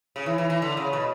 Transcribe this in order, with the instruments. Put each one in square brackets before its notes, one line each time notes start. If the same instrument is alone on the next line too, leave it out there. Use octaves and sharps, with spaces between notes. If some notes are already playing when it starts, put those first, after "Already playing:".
[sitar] C#3
E3
E3
E3
D3
C#3
B2